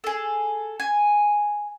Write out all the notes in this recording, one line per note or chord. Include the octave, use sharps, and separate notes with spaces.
G#4 A4
G#5